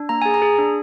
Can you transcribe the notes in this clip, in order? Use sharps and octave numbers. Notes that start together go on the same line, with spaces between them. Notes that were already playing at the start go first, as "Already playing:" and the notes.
Already playing: D4
A#3 A#5
G#4 G#5
A#5
G#4
D4